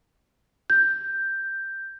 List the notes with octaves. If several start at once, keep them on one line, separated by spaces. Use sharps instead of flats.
G6